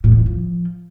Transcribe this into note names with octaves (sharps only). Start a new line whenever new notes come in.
A2
D#3
E3
F3